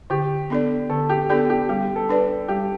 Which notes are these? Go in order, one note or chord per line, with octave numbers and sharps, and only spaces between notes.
D3 G4
B3 D4 A4 D5
D3 A4
G4
B3 D4 G4 A4 D5
G4
G3 G4
A4
D4 B4 D5
G3 G4